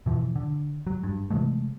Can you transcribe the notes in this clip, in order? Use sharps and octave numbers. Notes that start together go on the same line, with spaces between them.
B2 E3 F3
D3
F#3
G2
C3 E3 G#3 A3